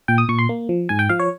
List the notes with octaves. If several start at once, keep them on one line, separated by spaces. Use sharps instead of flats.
A#2 G5
D#6
A#2 C#6
C6
A#3
F3
G#2 G#5
G5
F3 F5
C#5